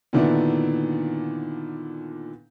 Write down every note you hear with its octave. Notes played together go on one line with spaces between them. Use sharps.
A#2 D3 D#3 B3 D4 E4